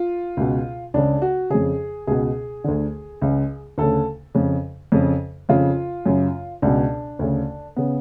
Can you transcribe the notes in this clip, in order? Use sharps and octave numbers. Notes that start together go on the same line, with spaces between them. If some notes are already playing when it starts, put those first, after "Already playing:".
Already playing: F4
C#2 B2
C#2 C#3 D4
F#4
F2 C#3 G#4
C#2 B2 G#4
D2 D3
C#2 C#3
D2 C#3 A4
F2 C#3
F2 C#3
F2 C#3 F4
F#2 C#3
C#2 B2 D4
D2 C#3
C#3 B3